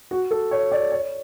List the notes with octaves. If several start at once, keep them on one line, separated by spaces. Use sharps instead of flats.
F#4
A4
C#5
D5
C#5